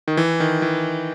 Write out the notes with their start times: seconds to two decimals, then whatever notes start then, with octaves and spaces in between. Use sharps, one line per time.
0.08 D#3
0.17 E3
0.40 D#3
0.62 E3